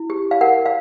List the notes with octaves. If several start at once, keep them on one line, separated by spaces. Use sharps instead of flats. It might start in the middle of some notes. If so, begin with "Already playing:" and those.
Already playing: E4
G4
F5
A#4 F#5
F5